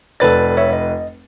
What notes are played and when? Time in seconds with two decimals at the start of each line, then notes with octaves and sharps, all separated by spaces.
0.20 F1 A4 B4 D5 A6
0.57 C#5 E5
0.73 D#5